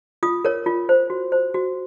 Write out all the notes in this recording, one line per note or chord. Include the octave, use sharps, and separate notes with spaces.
F4 D#6
A#4 C#5
F4
C5
F#4
C5
F#4